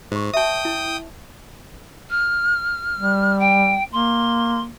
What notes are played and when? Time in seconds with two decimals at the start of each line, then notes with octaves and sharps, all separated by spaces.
0.12 G#2 C5 C#6
0.34 E5 G5 A5 D#6
0.65 E4
2.10 F6
2.99 G3
3.39 G5
3.92 A#3 C6